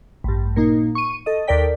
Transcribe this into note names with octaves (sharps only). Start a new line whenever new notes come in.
A1 G2
A#2 A#3 D#4
C#6 D#7
A4 D#5
D#2 A4 A#4 D5 G5 B6